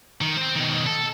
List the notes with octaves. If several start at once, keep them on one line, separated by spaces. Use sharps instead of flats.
D#3
C4 C5
B2 D#3
A4